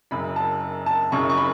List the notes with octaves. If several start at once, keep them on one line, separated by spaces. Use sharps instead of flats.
F#1 F#2 C#3 B5
A5
A5
F#1 F#2 C#3 C#6
C#6
B5